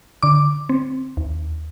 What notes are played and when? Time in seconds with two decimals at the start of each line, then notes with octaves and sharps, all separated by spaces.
0.23 D3 D6
0.69 C4
1.17 D#2